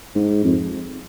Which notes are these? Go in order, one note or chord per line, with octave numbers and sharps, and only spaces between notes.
G#2
F2